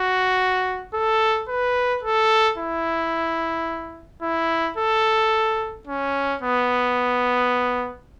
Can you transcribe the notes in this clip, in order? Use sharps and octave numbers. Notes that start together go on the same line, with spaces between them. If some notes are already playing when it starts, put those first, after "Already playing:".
Already playing: F#4
A4
B4
A4
E4
E4
A4
C#4
B3